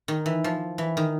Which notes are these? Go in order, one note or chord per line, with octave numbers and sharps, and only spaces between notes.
D#3
E3
F3
E3
D#3